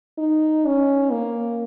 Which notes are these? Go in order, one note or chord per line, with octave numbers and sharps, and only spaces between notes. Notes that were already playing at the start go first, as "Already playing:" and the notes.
D#4
C#4
A#3